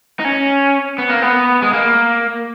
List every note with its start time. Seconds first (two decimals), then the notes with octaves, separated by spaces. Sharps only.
0.19 D#4
0.25 C#4
0.98 B3
1.10 A#3
1.22 B3
1.62 G#3
1.73 A#3